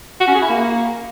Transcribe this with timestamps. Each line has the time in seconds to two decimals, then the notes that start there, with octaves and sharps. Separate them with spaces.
0.20 F#4
0.28 C#4
0.35 G#4
0.42 E4
0.49 A#3